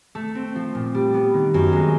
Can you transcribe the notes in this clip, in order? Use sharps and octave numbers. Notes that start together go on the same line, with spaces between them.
A3
C4
F3
A#2
G3
B3
D#3
F#2
G#3